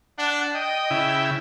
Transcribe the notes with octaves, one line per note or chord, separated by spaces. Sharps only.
D4 F#5
D#5 G5
C#3 E4